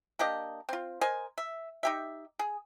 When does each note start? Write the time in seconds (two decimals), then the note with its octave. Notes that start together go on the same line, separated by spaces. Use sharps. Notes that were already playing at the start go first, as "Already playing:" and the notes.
0.19 A#3 D4 G4 D#5
0.69 C4 F4
1.01 A#4 C5 D#5 G#5
1.38 E5
1.83 D#4 G4 E5
2.39 G#4